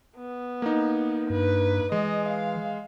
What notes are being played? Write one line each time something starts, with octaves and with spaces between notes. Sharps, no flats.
B3
A#3 D#4
G2 B4
E3 G#3 D#5
F5